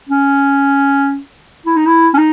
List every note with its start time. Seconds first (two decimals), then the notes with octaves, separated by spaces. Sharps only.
0.09 C#4
1.66 E4
1.76 D#4
1.86 E4
2.14 C#4
2.18 D#4